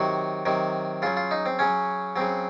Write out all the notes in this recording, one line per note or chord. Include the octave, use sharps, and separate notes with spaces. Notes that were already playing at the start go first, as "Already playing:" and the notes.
Already playing: C3 D#3 F#3 F#4
C3 D#3 F#3
C#3 F#3 F4
F4
D#4
C4
C#3 F#3 C#4
C#3 F#3 C4